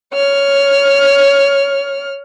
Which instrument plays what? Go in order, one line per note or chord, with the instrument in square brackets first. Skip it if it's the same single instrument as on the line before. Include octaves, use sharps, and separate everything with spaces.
[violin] C#5 F6